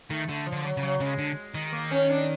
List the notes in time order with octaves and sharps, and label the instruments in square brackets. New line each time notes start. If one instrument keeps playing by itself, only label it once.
[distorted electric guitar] D#3 [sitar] A3
[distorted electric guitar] D3 [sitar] A3
[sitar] F3
[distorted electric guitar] D3
[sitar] F#3
[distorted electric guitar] C#3
[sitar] F#3
[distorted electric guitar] C#3 [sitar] G#3
[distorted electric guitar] D3
D#3
[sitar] A#3
C#4
D4